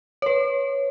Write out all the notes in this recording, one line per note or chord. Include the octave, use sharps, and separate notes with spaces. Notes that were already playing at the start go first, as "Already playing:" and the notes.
B4 C#5